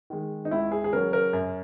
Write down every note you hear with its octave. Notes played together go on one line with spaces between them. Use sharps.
D#3 G#3
D#4
C#2 E4
G#4
G#4
C#3 F#3 A#4
A#4
F#2